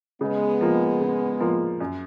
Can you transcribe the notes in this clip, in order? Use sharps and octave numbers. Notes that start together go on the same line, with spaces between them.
C#3 G#3 B3
F3 A#3 F4
C#3
F3 A#3 F4
F#2